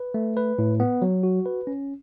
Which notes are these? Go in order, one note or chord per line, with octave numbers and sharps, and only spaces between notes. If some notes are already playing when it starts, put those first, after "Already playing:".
Already playing: B4
A3
B4
A2
B3
F#3
F#4
B4
C#4